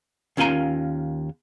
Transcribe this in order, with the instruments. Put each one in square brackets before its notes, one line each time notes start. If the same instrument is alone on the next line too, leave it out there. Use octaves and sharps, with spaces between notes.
[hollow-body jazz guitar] D#2 C#4 F4 A#4 G#5 A#5